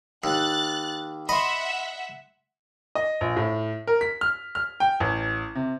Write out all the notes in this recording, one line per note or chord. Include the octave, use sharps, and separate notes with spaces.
D#2 F#6 A6
D#5 E5 F#5 B5 C6
D#5
A#1
A2
A#4
B6
F6
F6
G5
A1
C3